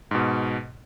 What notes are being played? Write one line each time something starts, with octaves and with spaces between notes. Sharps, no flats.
G#2 B2